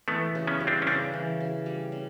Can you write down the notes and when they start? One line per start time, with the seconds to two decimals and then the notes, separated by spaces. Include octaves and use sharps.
0.08 E3 A3 B3
0.35 C#3
0.47 B3 C#4
0.60 G3
0.67 C4 D4
0.82 C#4
0.87 C#3 C4 D4
1.14 E3
1.40 C#3
1.66 G3
1.92 C#3